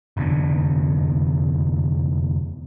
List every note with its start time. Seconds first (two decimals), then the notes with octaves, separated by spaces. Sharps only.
0.17 F1 E2 D3